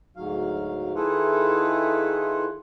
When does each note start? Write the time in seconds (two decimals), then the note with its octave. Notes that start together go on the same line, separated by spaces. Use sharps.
0.16 D2 G#2 F#3 F5
0.95 D#3 E4 F4 G#4 A4 B4